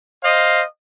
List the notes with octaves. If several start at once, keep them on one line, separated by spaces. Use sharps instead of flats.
C5 D#5 F5